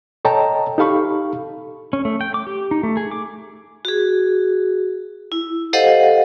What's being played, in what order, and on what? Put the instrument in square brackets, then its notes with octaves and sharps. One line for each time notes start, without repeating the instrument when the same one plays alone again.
[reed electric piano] A4 C#5 D#5 G5 A5 A#5
D#4 G4 A4 F5 B5 C#6
[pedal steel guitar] C#4
A3
G5
D6
G4
D#4
A3
G#4
D6
[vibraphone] F#4 G#4
E4
G4 A4 C5 D#5 F5 F#5